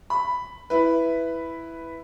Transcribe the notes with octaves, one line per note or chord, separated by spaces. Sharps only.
B5
E4 B4